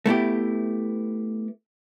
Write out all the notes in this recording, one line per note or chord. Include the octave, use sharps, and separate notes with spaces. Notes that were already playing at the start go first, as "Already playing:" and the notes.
A3 B3 E4 G4